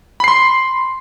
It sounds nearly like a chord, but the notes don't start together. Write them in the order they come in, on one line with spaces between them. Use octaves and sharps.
B5 C7 C6